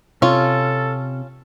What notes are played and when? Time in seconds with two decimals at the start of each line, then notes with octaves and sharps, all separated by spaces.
0.22 C3 C#4 F4 A4